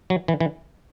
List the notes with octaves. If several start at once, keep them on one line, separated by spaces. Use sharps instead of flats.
F#3
E3
E3